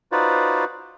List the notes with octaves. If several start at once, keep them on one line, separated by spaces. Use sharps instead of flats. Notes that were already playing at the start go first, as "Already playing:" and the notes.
D#4 F4 F#4 B4 C5 D5